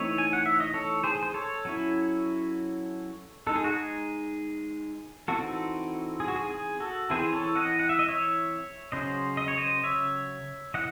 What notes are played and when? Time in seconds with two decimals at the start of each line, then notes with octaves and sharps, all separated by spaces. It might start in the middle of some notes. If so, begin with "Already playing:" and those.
Already playing: E3 A3 C4 D#4 C#5 E5
0.18 G#5
0.33 F#5
0.46 E5
0.60 D#5
0.74 A4 C#5
1.04 G#4 C5
1.23 C5
1.34 A4 C#5
1.65 F#3 C#4 E4
3.47 G#3 D#4 A4
3.55 G#4
3.64 F#4
3.73 G#4
5.28 E3 C4 D#4 F#4 A4
6.20 G#4
6.28 F#4
6.36 G#4
6.50 G#4
6.80 F#4 A4
7.10 E3 C4 E4 G#4 C5
7.33 A4 C#5
7.56 D#5 F#5
7.79 F#5
7.89 E5
7.99 D#5
8.08 C#5 E5
8.92 C#3 F#3 C#4 C5 D#5
9.37 D#5
9.48 C#5
9.57 C5 D#5
9.84 C#5 E5
10.74 E3 D#5 F#5